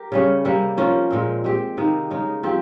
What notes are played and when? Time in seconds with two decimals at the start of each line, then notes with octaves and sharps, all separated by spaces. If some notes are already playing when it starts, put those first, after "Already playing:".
Already playing: G4 A#4
0.12 C#3 G3 C#4
0.45 C3 G3 A#3
0.77 F3 A#3 C#4 F4
1.11 A#2 G#3 C4
1.44 G#3 C4 G4
1.77 C3 D#3 A#3 D#4
2.10 C#3 G#3 D#4
2.43 F3 C4 G4